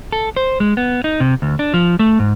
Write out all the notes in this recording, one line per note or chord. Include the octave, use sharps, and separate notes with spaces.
A4
C5
G#3
B3
D#4
C3
D2
D4
F3
A3
G#2